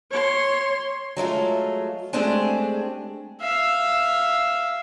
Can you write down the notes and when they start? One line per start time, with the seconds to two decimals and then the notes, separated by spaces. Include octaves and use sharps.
0.11 C#5 C6
1.17 F#3 G#3 A3 F4
2.13 G#3 A3 C4 D4 G4 G#4
3.41 E5 F5